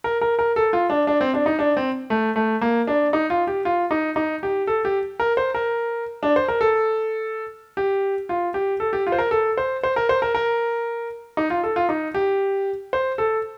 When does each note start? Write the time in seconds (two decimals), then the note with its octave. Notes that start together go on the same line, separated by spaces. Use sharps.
0.04 A#4
0.21 A#4
0.39 A#4
0.56 A4
0.73 F4
0.90 D4
1.07 D4
1.21 C4
1.34 D4
1.46 D#4
1.59 D4
1.77 C4
2.10 A3
2.36 A3
2.61 A#3
2.87 D4
3.13 D#4
3.30 F4
3.47 G4
3.65 F4
3.91 D#4
4.16 D#4
4.43 G4
4.67 A4
4.85 G4
5.20 A#4
5.37 C5
5.55 A#4
6.23 D4
6.36 C5
6.48 A#4
6.61 A4
7.77 G4
8.29 F4
8.54 G4
8.80 A4
8.93 G4
9.07 F4
9.12 C5
9.18 A#4
9.31 A4
9.57 C5
9.83 C5
9.96 A#4
10.09 C5
10.22 A#4
10.34 A#4
11.37 D#4
11.50 F4
11.64 A4
11.76 F4
11.89 D#4
12.14 G4
12.93 C5
13.18 A4